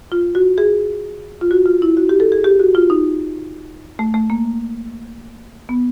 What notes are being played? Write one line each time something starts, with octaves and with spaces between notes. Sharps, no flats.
F4
F#4
G#4
F4
F#4
F4
E4
F#4
G4
A4
G#4
G4
F#4
F4
D#4
A3
A3
A#3
B3